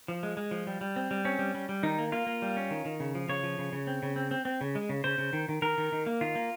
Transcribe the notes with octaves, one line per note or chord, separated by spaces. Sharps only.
F3
G#3
G#3
F3
G3
G3
C4
G3
C4 C#4
G3
G3
G3
D#3 D#4
A#3
A#3 F4
A#3
G3
C#4
D#3
D#3
C#3
F3
C#3 C#5
F3
C#3
C#3
C4
C#3
C4
C4
C4
C#3
G#3
C#3
C#3 C5
C#3
D#3
D#3
D#3 A#4
D#3
D#3
A#3
D#3 F4
A#3